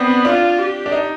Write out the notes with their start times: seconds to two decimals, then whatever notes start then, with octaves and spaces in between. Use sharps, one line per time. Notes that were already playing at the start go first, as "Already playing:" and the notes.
Already playing: B3 C4 D4
0.25 D4 F4
0.58 G4
0.86 D4
0.92 D#4